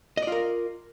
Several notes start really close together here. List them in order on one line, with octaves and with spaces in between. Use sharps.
D#5 D5 F4 A#4